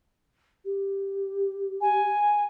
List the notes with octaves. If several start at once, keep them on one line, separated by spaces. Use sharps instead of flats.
G4
G#5